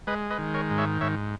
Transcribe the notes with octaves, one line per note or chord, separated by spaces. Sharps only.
G#3 B4 D#5
B4 D#5
D#3
A#4 C#5
G#2
C#5 E5
G#2 C#5 E5